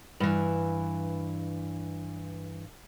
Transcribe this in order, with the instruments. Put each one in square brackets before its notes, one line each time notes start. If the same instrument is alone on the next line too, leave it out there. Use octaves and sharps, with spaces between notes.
[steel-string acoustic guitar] G2 E3